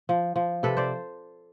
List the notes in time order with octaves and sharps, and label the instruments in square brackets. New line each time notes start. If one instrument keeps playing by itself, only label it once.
[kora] F3
F3
C3 A4 B4
C5 D5